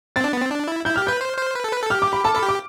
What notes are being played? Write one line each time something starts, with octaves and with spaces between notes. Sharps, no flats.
C4 A6
D4
B3
C4
D4
E4
E4 G6
G4 F6
B4 G6
C5
C5
B4
A4
B4
A4
G4 F6
D6
B5
A4 A5
A4 B5
G4
D6